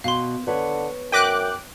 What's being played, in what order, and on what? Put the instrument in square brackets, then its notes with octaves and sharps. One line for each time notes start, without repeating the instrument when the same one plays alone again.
[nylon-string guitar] B2 [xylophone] F5 C6
[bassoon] D3 [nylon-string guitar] B4 C#5
[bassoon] F#2 [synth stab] G5 D6 F#6 [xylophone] A#6 B6 D#7